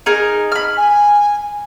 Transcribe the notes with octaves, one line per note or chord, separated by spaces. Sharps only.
D#4 G#4 A#4
B5 F6
G#5